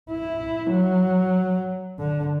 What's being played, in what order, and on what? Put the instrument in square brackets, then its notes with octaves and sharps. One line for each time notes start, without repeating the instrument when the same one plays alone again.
[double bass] E4
F#3
D3